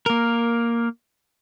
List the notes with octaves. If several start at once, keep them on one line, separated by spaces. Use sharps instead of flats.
A#3 A#4